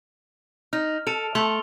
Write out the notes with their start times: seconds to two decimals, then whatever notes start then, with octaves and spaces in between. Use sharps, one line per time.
0.73 D#4 F6
1.07 A4 A5 D7 F7
1.35 A3 C6 F7 G7